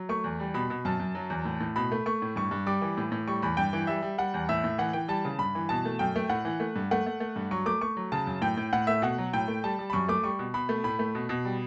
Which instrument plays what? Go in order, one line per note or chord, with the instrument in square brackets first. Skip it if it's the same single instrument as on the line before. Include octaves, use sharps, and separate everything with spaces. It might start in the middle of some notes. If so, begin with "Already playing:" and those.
Already playing: [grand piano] F#3
A3 C#6
E2
G3
B2 B5
B2
F#2 A5
F#2
F#3
E2
A2
A2
B2 B5
A3
A3 C#6
A2
G2 C#6
G2
G3 D6
E3
A2
A2
G3 C#6
E2 B5
G2 G5
E3
G3 E5
G3
G3 F#5
E2
A2 E5
A2
E3 F#5
E3 G5
G3 A5
C#3
G2 B5
E3
B2 A5
A3
F#2 G5
A3
A2 F#5
E3
A3
G2
A3 F#5
A3
A3
G2
F#3 C#6
A3 D6
A3 C#6
F#3
C#3 A5
F#2
A2 G5
A2
A2 F#5
A3 E5
B2 F#5
F#3
A2 G5
A3
G3 A5
G3
B5
F#2 C#6
A3 D6
G3 C#6
B2
B2 B5
A3
A2 B5
A3
B2
B2
G3